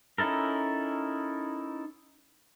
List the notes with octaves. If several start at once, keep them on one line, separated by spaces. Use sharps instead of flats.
C#4 D#4 E4 A4 A#4